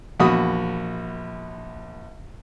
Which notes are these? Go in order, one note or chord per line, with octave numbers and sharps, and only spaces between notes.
A#1 E2 F#4 B5 D#6